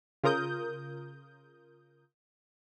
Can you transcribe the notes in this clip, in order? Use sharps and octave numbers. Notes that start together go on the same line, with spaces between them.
C#3 F4 A#4 D#6 G6